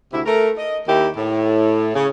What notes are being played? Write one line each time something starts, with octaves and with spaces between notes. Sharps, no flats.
D2 C3 E4
A3 A#4
D#5
D#2 D#3 D#4 E4 G4
A2
C#3